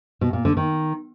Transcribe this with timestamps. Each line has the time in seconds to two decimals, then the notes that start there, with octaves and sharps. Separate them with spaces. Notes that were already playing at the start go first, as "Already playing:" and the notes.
0.21 B2
0.33 A#2
0.45 D3
0.57 D#3